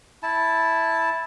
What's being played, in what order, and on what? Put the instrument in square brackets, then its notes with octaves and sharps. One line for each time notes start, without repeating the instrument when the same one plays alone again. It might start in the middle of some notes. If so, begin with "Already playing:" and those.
[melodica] E4 A5